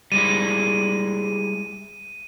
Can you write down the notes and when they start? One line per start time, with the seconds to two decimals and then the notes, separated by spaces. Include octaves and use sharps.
0.12 G3 G#3 E4 D#7